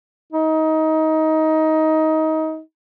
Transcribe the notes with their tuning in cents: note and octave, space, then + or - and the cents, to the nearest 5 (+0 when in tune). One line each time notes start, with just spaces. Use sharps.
D#4 +20